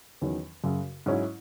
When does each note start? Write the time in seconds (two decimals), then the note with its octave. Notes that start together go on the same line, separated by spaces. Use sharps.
0.21 E2 D#3 F#3 C#4
0.64 F#2 C#3 F#3
1.06 G#2 F#3 C#4 E4